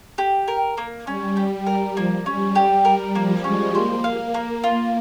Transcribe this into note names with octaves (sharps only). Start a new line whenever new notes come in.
G4
A#4
A#3
G3 C#4
G4
A#4
F3 A#3
G3 C#4
G3 G4
G3 A#4
F3 A#3
G#3 C#4
A#3 C5
F5
A#3
F4